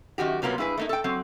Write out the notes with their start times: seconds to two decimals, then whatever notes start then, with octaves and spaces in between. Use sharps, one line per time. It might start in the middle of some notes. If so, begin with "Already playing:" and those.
0.18 F#2 D#3 F#4 G4
0.42 C3 F#3 A#3 B3 F4
0.58 G2 E4 G#4 B4
0.78 A3 A#3 D#4
0.89 A4 G5
1.04 F#3 C4